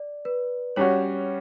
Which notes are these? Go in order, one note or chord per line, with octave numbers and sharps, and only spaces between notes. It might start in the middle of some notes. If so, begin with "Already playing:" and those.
Already playing: D5
B4
G3 C#4 F#4 C#5